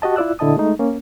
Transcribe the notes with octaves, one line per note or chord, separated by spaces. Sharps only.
F#4 G4 D#5 A5
E4 F4 D5 E6 F#6
A#2 D3 E4 D#5 A5 D#6
G#3 A3 D#4
A#3 C#4